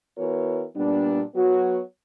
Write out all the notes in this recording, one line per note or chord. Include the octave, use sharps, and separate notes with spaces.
E3 B3 F#4 A#4 C#5
A#2 G3 B3 D4
F#3 B3 F#4 C#5